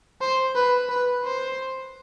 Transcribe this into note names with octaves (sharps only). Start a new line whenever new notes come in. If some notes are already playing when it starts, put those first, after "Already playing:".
C5
B4
B4
C5